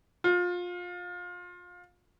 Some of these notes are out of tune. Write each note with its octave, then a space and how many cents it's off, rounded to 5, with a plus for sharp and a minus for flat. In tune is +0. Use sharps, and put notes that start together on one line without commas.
F4 +25